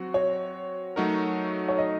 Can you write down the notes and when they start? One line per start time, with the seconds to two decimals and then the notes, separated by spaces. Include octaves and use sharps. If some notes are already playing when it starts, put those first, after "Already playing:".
Already playing: F#3 C4 F#4
0.14 C#5
0.96 F#3 A3 D#4 F#4 A#4
1.68 C#5
1.78 D#5